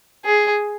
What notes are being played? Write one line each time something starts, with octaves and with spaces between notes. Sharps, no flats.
G#4